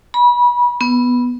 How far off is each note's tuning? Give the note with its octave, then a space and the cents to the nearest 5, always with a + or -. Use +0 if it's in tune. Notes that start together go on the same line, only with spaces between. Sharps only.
B5 -30
B3 -5